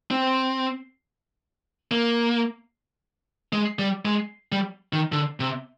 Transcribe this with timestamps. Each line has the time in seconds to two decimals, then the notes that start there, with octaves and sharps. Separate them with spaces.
0.11 C4
1.91 A#3
3.53 G#3
3.79 G3
4.05 G#3
4.52 G3
4.93 D#3
5.12 D3
5.40 C3